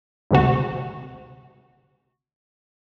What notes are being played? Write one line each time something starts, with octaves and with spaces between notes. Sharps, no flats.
G#1 D2 C3 F#4